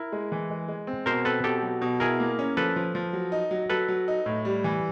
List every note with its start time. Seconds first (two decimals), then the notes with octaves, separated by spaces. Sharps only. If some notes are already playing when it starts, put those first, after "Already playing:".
Already playing: E4 A#4
0.12 G#3
0.32 E3
0.50 G#3
0.68 G#3
0.87 C4
1.06 B2 A#4 C5
1.25 C4 A4 B4
1.44 B2 G4 A4
1.62 F#3
1.82 B2
2.00 E4 G#4 A#4
2.20 A#3
2.39 C#4
2.57 F3 A4 B4
2.76 F3
2.95 F3
3.13 F#3
3.32 D#4
3.51 F#3
3.70 F#3 A4 B4
3.88 F#3
4.08 D#4
4.26 A2
4.45 G3
4.64 E3